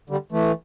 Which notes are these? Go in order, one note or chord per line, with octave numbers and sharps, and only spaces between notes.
D3 G3
E3 A3